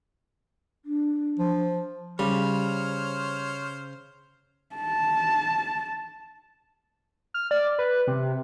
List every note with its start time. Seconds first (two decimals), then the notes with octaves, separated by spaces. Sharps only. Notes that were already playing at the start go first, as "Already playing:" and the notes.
0.85 D4
1.39 F3
2.19 C#3 G3 C5 C#5 F6
4.76 A5
7.34 F6
7.51 D5
7.79 B4
8.07 C3